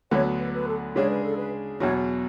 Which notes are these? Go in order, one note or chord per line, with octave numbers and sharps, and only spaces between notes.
D2 D3 F#3 B3 C#5
B4
B4
A4
C#3 G#3 D4 G#4 C#5
B4
A4
B4
E2 B2 F#3 C#5